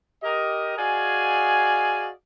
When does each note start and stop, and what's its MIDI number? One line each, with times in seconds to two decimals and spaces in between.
0.23 0.78 67
0.23 0.78 70
0.23 0.78 75
0.78 2.11 66
0.78 2.11 68
0.78 2.11 74
0.78 2.11 75
0.78 2.11 77
0.78 2.11 80